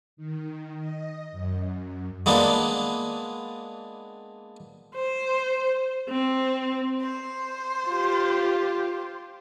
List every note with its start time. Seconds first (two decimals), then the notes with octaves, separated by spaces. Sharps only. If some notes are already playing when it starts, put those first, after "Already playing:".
0.17 D#3
0.78 D#5
1.32 F#2
2.26 G#3 A#3 B3 D4
4.95 C5
6.09 C4
7.01 C5
7.89 F4 G4